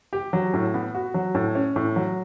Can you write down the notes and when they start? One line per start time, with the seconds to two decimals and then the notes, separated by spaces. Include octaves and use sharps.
0.13 G4
0.33 F#3
0.54 A2
0.74 B3
0.95 F#4
1.14 F#3
1.35 A2
1.55 C#4
1.76 A2
1.96 F#3